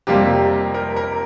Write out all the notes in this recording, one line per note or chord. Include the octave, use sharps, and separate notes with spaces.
F2 C3 G3 A#3 F4 G4
A#4
A#4